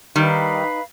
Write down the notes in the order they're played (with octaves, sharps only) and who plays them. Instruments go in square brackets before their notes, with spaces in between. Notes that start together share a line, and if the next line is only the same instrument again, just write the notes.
[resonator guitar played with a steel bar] D#3 G3 [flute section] D#4 B4 F5 B5